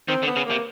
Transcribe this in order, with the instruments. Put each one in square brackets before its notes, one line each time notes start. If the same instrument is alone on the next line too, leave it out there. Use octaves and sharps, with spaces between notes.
[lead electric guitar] D#3 [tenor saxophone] C4
[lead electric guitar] D3
[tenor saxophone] B3
[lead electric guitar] C#3
[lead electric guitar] C3 [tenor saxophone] A#3